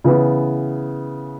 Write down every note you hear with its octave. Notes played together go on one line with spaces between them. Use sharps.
C#3 E3 B3